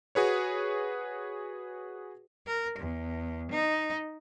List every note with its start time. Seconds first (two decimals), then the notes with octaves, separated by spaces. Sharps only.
0.15 F#4 G#4 B4 C#5
2.46 A#4
2.79 E2
3.51 D#4